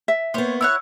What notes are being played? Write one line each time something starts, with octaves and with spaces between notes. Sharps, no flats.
E5
A#3 B3 C5 C#5
E4 C#5 F#5 E6